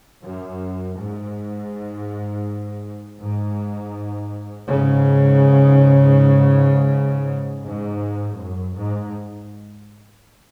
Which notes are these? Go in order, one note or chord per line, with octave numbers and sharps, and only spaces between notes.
F#2
G#2
G#2
G#2 C#3
G#2
F#2
G#2